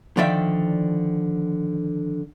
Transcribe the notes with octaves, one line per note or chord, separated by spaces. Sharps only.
D3 D#3 F3 D5 E5 G5